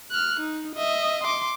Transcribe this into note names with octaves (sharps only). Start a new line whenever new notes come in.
F6 F#6
D#4
D#5 E5
C6 D6